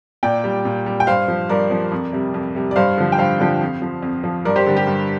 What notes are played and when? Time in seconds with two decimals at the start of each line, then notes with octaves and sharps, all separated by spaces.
0.23 A#2 D5 G5
0.44 G3
0.65 A#2
0.86 G3
1.00 G5
1.07 G2 C5 F5
1.28 F3
1.49 G2 A#4 D5
1.71 F3
1.92 F2
2.13 C3 G3
2.34 F2
2.55 C3 G3
2.71 D5
2.76 G2 C5 F5
2.98 D3 F3
3.12 G5
3.18 G2 C5 F5
3.40 D3 F3
3.61 F2
3.82 F3
4.03 F2
4.24 F3
4.45 G2 A#4 D5
4.56 G4 C5
4.66 D3 G3
4.77 G4
4.87 G2